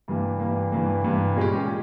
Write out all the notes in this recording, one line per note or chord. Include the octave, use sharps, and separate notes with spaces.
G2 E3 A#3
G2 E3 A#3
G2 E3 A#3
G2 E3 A#3
A#2 G#3 C#4 G4